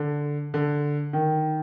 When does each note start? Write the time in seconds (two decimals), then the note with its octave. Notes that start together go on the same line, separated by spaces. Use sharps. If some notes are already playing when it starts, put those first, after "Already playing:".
Already playing: D3
0.54 D3
1.13 D#3